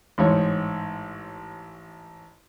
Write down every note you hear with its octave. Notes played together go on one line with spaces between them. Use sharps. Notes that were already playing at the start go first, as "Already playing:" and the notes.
A1 G#2 C#5